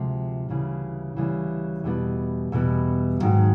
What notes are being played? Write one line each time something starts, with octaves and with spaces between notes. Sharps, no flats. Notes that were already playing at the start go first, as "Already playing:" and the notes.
Already playing: D2 C3 F3 G#3
D2 C#3 E3 G3
D2 C#3 E3 G3
E2 B2 G3 B3
E2 B2 G3 B3
G#2 D#3 F#3